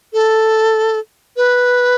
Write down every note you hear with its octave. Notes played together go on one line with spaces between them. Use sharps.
A4
B4